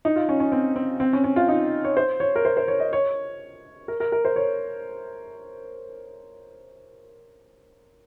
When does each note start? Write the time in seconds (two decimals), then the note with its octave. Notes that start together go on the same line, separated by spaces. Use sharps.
0.05 D#4
0.16 F4
0.29 C#4
0.40 C#4
0.52 C4
0.76 C4
1.00 C4
1.13 C#4
1.24 C#4
1.36 F4
1.48 D#4
1.85 C#5
1.97 C5
2.20 C#5
2.36 A#4
2.45 C5
2.57 C5
2.68 C#5
2.80 D#5
2.93 C#5
3.88 A#4
4.00 A#4
4.12 A#4
4.25 C5
4.36 C#5